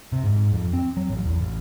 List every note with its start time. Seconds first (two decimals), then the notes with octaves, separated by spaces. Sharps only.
0.12 C3
0.24 G#2
0.53 F2
0.73 C4
0.97 F#3
1.10 A1
1.26 E2
1.39 A1